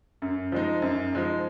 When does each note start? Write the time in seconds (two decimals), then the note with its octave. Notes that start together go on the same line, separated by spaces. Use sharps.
0.22 F#2
0.52 F3 G#3 D#4
0.82 F#2
1.13 F3 G#3 D#4